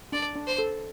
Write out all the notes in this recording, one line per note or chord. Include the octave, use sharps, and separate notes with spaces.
D4 D5
D4
C5
A4